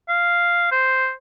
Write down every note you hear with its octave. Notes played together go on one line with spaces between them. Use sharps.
F5
C5